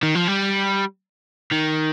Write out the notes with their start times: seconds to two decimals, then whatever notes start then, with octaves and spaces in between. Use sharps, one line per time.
0.03 D#3
0.15 F3
0.27 G3
1.51 D#3